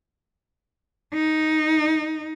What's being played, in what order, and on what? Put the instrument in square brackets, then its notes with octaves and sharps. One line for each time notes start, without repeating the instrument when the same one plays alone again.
[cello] D#4